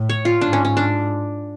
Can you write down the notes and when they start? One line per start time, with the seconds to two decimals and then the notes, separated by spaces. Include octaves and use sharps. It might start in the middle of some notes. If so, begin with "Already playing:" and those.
Already playing: A2
0.09 C#5
0.25 F4
0.40 G#2 D4
0.53 C#4
0.65 C#4
0.77 D4